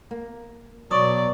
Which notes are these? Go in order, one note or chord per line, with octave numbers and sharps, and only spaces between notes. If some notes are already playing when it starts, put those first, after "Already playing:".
A#3
B2 F#3 D5 C#6 D#6